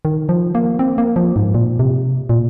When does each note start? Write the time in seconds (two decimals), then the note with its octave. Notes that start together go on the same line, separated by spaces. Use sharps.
0.05 D#3
0.29 F3
0.55 A#3
0.79 C4
0.98 A#3
1.16 F3
1.36 G#2
1.54 A#2
1.79 C3
2.29 A#2